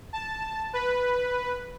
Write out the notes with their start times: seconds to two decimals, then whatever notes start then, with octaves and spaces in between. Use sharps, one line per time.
0.13 A5
0.73 B4